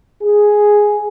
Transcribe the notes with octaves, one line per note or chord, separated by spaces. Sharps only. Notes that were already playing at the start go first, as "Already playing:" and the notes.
G#4